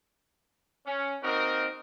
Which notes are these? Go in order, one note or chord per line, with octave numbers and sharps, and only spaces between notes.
C#4
A#3 C4 D#4 F#4 A#4